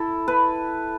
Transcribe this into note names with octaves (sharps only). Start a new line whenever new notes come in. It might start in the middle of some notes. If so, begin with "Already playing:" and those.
Already playing: E4 A4
B4